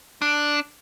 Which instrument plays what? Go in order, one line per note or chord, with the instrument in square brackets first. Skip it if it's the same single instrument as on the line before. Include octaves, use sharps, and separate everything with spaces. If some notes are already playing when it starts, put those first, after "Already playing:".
[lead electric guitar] D4